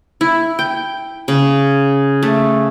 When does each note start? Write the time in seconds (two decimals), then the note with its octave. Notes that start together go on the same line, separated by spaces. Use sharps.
0.21 E4
0.59 G5
1.28 C#3
2.23 A3